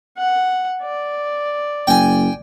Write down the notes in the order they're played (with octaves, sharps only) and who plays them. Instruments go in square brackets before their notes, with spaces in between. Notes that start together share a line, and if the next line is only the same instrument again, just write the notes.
[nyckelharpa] F#5
D5
[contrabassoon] F#1 [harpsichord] G5 G#5